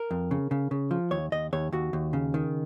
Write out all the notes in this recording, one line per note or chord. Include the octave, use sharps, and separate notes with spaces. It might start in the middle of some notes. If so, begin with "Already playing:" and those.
Already playing: A#4
F2
C#3
C#3
C#3
F3
D#2 C#5
D#2 D#5
D#2 C#5
D#2 F#4
D#2
C#3
D#3